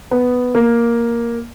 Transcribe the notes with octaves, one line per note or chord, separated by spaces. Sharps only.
B3
A#3